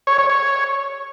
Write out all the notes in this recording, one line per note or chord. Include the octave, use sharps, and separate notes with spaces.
C#5
C#5
C#5